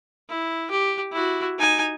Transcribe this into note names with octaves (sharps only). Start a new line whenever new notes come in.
E4
G4
E4 F#4
D#4 G#5